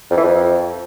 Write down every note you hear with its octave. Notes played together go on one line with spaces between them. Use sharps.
F2
E3
F2